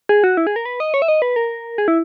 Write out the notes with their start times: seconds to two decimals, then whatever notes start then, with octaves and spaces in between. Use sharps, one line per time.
0.09 G#4
0.24 F#4
0.37 E4
0.47 G#4
0.56 A#4
0.65 B4
0.80 D#5
0.94 C#5
1.02 E5
1.08 D#5
1.22 B4
1.36 A#4
1.78 G#4
1.88 E4